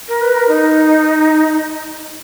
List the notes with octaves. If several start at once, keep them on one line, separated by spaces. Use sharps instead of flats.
A#4
B4
A#4
D#4